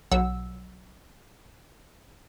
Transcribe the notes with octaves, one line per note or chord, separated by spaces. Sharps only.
B1 F#3 F#5 E6